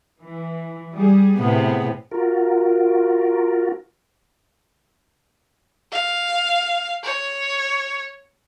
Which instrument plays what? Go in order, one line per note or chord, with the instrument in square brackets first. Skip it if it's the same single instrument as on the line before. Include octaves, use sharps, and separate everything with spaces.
[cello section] E3
G3 G#4
[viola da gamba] A2 C3 [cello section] B3 G#4
[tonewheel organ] F4 F#4 A#4
[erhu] F5
C#5